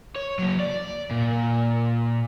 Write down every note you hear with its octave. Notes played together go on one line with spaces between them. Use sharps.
C#5
F#3 A#3
D5
A#2